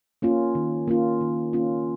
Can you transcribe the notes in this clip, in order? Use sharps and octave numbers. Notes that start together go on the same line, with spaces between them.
A#3 C#4 F4
D#3
A#3 C#4 F4
D#3
A#3 C#4 F4